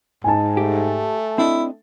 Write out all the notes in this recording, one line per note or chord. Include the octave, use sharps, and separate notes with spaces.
G#2 D#4 G#5 A5
A3 G4
C4 D4 E4 D#5